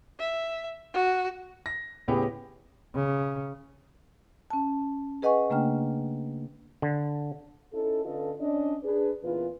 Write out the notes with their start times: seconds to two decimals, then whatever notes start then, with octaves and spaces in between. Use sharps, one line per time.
0.19 E5
0.93 F#4
1.66 A#6
2.08 A2 C#3 B3 G4 G#4
2.95 C#3
4.50 C#4 A5
5.22 G#4 B4 D#5 F#5 G#5 C#6
5.50 C#3 A3 A#3 D4 G5 F6
6.82 D3
7.73 C#4 D#4 E4 A4
8.05 D3 C#4 F4 A4 B4 D#5
8.39 C#4 D4 D#5
8.83 D4 G#4 B4
9.23 E2 A#2 C#3 F4 B4